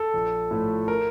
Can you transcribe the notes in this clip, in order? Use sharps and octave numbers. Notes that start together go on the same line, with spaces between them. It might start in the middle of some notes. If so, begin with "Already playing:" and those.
Already playing: A4
A#1
A2 F3 A3
A#4